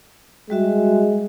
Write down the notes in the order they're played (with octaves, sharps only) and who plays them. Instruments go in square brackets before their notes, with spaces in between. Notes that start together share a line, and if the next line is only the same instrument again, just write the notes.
[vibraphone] G3 F#4 E5 [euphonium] G#3